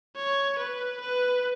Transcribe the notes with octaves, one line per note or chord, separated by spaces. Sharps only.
C#5
B4
B4